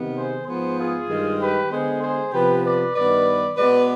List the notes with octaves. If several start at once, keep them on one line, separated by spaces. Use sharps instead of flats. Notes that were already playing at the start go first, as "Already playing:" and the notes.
Already playing: C3 D#3 B3
G#4 C5
G#2 F3 B3 G#4 C5
F4 G#4
G2 D#3 G#3
G4 B4
D3 G#3 B3 G#4 C5
G#4 C5
C3 F3 B3 G4 B4
B4 D5
G2 D#3 B3 B4 D5
B2 G#3 B3 B4 D5